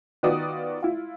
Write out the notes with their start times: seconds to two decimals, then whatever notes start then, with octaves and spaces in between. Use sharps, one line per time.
0.23 D#3 B3 F4 F#4 D5 D#6
0.83 E4 F4